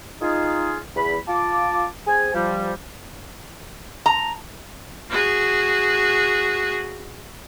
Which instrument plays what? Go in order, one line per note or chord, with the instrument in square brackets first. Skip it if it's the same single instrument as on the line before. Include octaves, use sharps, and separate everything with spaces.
[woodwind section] D#4 F4 G#4
E2 B5
F4 A5 D6
C4 G#4 C5 G#5
F3 G3
[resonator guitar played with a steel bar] A#5
[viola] F#4 G#4